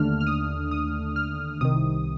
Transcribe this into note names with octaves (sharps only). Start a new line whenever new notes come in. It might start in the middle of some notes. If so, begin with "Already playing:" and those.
Already playing: D#2 D3 A3 D4 F6
F6
D#6
D#6
F6
C2 C3 D#3 D#6